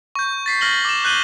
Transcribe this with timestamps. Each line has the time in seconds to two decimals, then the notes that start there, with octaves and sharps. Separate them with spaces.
0.15 C#6 G6
0.46 A6 B6 C7
0.61 F6 A#6 F#7 G7
0.85 D6 E7
1.05 F#6 G6 A6 D#7 F#7 G7